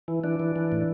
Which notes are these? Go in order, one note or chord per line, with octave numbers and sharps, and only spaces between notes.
E3
E3 D4
E3
E3
A2